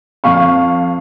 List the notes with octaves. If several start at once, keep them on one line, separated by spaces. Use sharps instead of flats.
F2 F5 C#6